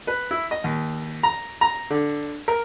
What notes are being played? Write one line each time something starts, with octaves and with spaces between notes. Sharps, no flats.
B4
E4
D#5
D#2
A#5
A#5
D3
A#4